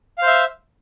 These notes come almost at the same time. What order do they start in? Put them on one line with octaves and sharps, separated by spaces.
F5 C5 E5